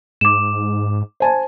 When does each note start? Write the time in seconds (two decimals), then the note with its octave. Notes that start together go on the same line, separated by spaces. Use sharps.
0.21 G#2 D6 E7
1.20 C5 G#5 A5